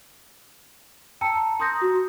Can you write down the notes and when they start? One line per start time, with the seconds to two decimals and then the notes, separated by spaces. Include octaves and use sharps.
1.21 G5 A5 A#5 E6 C#7
1.59 A#5 C6 D#6 G6 A#6
1.81 F#4